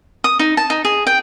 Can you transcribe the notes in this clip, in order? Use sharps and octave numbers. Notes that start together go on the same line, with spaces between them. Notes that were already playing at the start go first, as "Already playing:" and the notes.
D#6
D#4
A5
D#4
G#4
G5